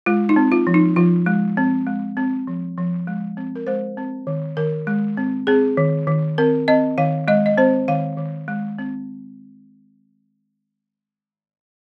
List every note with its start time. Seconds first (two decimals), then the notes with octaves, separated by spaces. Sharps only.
0.06 G#3 F4
0.29 D#4
0.36 C4
0.52 F4
0.67 F3
0.74 D#4
0.96 F3 F4
1.26 G#3
1.57 C4
1.87 G#3
2.17 C4
2.47 F3
2.78 F3
3.07 G#3
3.37 C4
3.56 A#4
3.67 G#3 C5
3.98 C4
4.27 D#3
4.57 D#3 A#4
4.87 G#3
5.17 C4
5.47 C4 G#4
5.77 D#3
6.07 D#3
6.38 C4 A#4
6.68 C4 D#5
6.98 D#3 F5
7.28 G#3 D#5
7.46 D#5
7.58 C4 C5
7.88 D#3 F5
8.17 D#3
8.48 G#3
8.79 C4